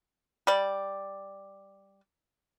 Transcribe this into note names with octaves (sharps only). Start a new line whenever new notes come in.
G3 D5